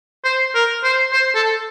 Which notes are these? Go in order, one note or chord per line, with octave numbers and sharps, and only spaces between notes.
C5
A#4
C5
C5
A4